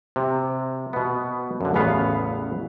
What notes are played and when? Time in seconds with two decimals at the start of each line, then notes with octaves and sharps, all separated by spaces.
0.16 C3
0.93 B2 B3
1.61 F#2 D3
1.74 A1 E2 C#3 B3 F5